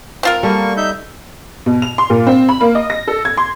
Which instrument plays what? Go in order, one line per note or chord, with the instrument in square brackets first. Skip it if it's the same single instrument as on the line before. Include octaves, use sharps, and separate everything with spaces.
[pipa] C4 F4 A#4
[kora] G3 B3 A4 [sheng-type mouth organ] A#3 C#6
[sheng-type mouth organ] D#4 E5 G6
[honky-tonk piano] B2
F7
C6
A#2
C4
B5
A#3
D#5
A#6
A4
G#6
C6